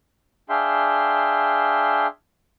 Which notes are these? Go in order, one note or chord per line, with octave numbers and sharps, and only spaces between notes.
D4 G#4 E5 F5 G5 C6